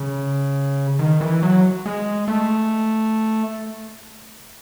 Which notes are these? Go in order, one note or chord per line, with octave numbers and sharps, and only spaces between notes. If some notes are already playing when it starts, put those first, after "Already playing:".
Already playing: C#3
D#3
E3
F#3
G#3
A3